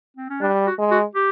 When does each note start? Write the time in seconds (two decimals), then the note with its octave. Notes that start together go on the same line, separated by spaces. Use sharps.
0.17 C4
0.30 C#4
0.41 G3 D4
0.67 F#4
0.78 G#3
0.91 F#4
1.15 G4